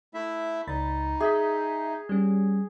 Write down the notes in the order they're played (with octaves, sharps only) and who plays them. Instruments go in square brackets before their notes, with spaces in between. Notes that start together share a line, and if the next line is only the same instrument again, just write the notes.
[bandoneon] A3 E4 E5
[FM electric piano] C#2 B5 A6 [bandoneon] D#4
[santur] G#4 [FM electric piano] E5 G6 B6
[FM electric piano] G3 C#4